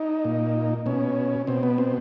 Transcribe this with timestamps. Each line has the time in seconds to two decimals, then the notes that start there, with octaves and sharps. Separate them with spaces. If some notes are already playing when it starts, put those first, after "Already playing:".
Already playing: D#4
0.25 A#2
0.86 B2 C#4
1.47 B2 C4
1.63 B3
1.78 C4